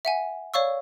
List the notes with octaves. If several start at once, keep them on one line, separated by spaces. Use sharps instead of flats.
E5 F#5 G#5
C#5 D5 F5 C#6 E6